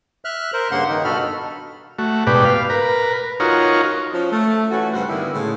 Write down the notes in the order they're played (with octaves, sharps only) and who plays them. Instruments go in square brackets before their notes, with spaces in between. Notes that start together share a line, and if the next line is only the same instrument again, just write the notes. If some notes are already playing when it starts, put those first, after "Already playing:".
[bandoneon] E5 F6 F#6
A#4 C5
G2 C#3 A#3 F#5 C6
D#3 D#4
G2 B2 F#4 A4 B5 F6
[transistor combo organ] A3 F#4
G#2 B2 G4 B4 D5
F5
A#4 B4
D#4 F4 F#4 A#4 C#5
[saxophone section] F3 C#4
A3
E3 A3 C#4 F#4
G2 C#3 F#4 C5 F#5
D3 D#3 G3 A#3 B3 E4
A2 C#3 G#3